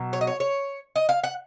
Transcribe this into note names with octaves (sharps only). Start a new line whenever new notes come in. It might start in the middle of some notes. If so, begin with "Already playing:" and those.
Already playing: B2 F#3
C#5
D#5
C#5
C#5
D#5
F5
F#5